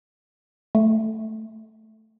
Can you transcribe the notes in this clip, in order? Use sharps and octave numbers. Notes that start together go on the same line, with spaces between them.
A3